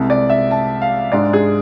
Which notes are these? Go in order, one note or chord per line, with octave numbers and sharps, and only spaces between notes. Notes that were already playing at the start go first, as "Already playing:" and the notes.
Already playing: C2 C3 G#3
D5
E5
A5
F5
G#2 G#3 D4 D5
G#4